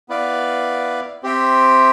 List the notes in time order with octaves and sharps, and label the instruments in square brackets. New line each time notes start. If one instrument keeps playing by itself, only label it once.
[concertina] B3 E4 B4 D5 F5
C4 G4 C5 E5 G5